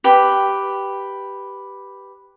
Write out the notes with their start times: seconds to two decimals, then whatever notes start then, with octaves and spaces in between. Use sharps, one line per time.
0.04 G4 B4